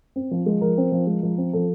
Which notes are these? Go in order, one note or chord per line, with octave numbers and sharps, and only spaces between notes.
C4
F3
G#3
F3 A#4
C4
F3
G#3
F3
C4
F3 A4